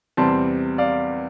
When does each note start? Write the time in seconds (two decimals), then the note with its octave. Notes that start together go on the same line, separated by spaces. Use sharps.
0.17 E2 C3 G3 C4 A5 C6
0.78 D5 F5